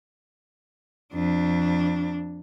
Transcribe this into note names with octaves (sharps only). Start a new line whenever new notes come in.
F2 D4